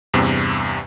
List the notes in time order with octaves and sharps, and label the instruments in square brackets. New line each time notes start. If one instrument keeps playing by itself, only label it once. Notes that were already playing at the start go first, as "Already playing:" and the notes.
[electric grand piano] E2 G2 C3